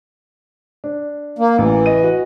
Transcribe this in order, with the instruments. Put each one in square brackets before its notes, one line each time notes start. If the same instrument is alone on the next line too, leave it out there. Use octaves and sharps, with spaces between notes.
[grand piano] D4
[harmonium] A#3
[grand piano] A1 [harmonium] E3
[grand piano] D#5 D#7
F#4 D#5